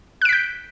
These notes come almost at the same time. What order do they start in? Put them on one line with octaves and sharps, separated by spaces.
F#6 D7 B6 G6